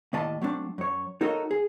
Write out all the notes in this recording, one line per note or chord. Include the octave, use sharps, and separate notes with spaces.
D#2 A2 D5 D#5 A5
F#3 A3 C4 D4
F#2 C#5
D#4 F#4 A4 A#4 C#5 D#5
G#4